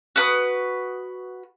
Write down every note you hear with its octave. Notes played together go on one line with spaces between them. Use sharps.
F#4 B4 D#6